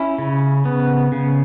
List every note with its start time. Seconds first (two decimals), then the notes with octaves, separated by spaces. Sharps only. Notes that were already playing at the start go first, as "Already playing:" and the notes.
Already playing: C#4 E4
0.18 C#3
0.65 B3
1.12 C#3